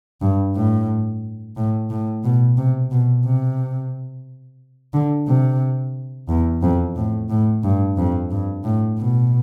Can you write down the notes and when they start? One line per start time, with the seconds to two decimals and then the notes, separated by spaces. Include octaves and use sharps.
0.21 G2
0.55 A2
1.56 A2
1.90 A2
2.24 B2
2.58 C3
2.91 B2
3.25 C3
4.94 D3
5.27 C3
6.29 E2
6.62 F2
6.96 A2
7.30 A2
7.64 G2
7.97 F2
8.31 G2
8.64 A2
8.98 B2